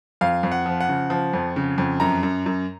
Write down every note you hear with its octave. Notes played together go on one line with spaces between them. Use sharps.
F2 F5
F2
F#5
F3
F#5
C#3
F3
F2
C#3
F2
F#2 A#5
F#2
F#2